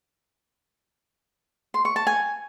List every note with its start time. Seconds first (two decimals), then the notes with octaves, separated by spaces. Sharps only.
1.74 C6
1.85 C#6
1.96 A5
2.07 G#5